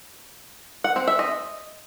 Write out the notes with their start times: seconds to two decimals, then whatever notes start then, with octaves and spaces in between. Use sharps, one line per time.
0.84 F#5
0.96 C4
1.08 E5
1.19 D#5